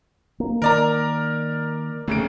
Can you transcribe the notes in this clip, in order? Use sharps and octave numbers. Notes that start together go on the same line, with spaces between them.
A#3
D#3 A#3 A#4 D5 A#5
F1 C#3 A3 D7